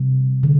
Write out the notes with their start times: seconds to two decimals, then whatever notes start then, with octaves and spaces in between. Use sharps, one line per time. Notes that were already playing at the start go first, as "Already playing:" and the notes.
Already playing: C3 G3
0.43 D3